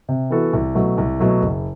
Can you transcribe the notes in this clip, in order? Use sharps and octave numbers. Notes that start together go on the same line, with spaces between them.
C3
E3 B3 F#4 A4
C2
B2 F#3 A3
C2
B2 F#3 A3
F#1